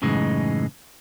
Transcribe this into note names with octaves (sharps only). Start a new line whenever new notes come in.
F#2 A2 C#3 E3 G#3 D#4